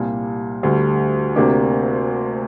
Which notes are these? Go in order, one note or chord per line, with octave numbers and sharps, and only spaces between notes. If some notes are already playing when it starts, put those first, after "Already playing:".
Already playing: C2 A#2 G3
D2 D3 G3
D2 C3 A#3 D4 G4